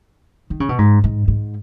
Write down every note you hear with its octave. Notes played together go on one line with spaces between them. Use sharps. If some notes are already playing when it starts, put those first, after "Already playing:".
D#3
C#3
B2
G#2
G#2
G#2